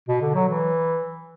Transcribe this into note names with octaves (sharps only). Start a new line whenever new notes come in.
B2
D3
F#3
E3